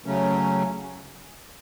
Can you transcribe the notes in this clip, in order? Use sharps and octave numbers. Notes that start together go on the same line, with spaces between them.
C#3 F#3 A3 C#4